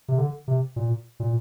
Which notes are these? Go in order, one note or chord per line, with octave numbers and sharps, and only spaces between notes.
C3
D3
C3
A#2
A#2